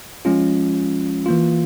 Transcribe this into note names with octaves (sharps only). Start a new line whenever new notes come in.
F3 G#3 C#4 F4
E3 A#3 F4